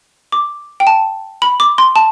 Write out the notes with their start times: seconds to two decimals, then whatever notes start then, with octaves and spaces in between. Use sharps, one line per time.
0.32 D6
0.80 G5
0.87 A5
1.42 B5
1.60 D6
1.78 C6
1.96 A5